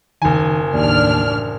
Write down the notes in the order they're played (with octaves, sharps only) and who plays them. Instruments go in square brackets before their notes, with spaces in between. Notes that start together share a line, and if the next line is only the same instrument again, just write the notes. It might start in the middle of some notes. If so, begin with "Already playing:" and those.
[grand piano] F#1 G#5 [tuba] D#3
[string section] A1 D4 F6 [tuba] D#2